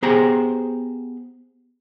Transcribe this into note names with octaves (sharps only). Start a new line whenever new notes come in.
B3 G4 G#4 C5 A#5